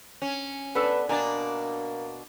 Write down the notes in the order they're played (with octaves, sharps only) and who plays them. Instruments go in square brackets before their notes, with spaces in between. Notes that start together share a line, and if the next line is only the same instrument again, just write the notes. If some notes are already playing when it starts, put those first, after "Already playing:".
[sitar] C#4
[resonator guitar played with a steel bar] B3 D4 A4 [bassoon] B4
[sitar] B2 D4 D5 [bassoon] A#3 [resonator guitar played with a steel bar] G#5 A#5